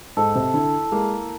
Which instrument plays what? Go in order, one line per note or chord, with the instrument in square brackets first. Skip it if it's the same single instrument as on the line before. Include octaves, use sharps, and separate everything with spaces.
[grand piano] G#2 [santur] A4
[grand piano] C3
[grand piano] D3 [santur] E4
[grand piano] G#3 [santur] A#3